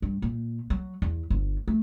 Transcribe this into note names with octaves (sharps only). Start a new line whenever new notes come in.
G2
A#2
F#3
E2
G1
A3